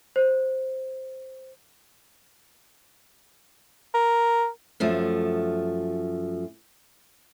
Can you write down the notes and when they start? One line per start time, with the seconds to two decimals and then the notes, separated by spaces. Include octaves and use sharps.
0.16 C5
3.94 A#4
4.80 F#2 F3 A3